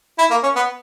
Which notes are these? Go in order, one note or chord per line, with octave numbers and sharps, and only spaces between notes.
E4
A#3
C#4
B3